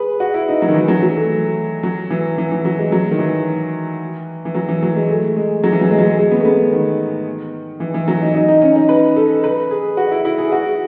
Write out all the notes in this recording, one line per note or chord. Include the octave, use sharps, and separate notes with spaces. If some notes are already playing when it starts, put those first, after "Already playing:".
Already playing: G#4 B4
F#4
E4
D#4
F#3
D#3
E3
F#3
F#3
A3
F#3
E3
E3
E3
F#3
G#3
F#3
D#3
E3
E3
F#3
E3
F#3
G#3
A3
G#3
F#3
E3
F#3
G#3
F#3
G#3
G#3
B3
A3
B3
D#3
E3
E3
F#3
D#4
D#4
D#4
C#4
D#4
B4
A4
B4
G#4
F#4
E4
E4
G#4
F#4